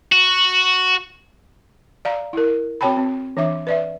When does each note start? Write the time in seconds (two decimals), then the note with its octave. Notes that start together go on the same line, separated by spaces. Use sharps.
0.12 F#4
2.05 D5 F5 A#5
2.33 E4 A#4
2.81 C4 F#4 C#5 G5 A5 B5
2.97 C4
3.37 E3 D4 E5 D6
3.67 B4 D5 E5